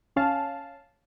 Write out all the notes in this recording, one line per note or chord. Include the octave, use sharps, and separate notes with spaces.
D#2 C#4 F5 A5